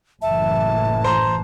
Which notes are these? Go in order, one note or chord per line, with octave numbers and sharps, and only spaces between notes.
F#1 A2 E3 E5 A5
C5 A#5 C6